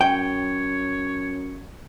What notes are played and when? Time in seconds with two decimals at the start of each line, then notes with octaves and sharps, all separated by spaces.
0.01 F#2 C#5 G5